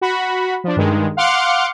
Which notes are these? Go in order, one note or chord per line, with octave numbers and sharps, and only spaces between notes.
F#4 B5
F3 D4
G2 D#3 G#3
F5 F#5 C6 D6 F6 C#7